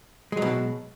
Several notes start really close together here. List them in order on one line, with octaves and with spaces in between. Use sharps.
G#3 F#3 B2